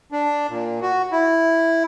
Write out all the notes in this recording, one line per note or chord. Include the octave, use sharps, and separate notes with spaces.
D4
A#2
F#4
E4